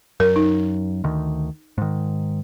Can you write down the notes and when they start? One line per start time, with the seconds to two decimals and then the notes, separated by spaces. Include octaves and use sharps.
0.20 F#2 A#4
0.36 D#4
1.04 D2 D#3
1.78 G#2 D#3